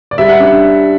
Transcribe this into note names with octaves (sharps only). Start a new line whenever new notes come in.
D5
G3 E5
F#5
D4 F#5